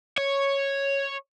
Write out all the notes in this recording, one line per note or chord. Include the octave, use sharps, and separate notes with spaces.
C#5